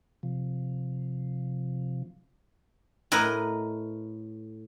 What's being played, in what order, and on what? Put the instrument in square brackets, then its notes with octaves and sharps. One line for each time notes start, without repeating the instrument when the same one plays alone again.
[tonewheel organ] C3 F3
[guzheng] A2 A#4 B4 D#5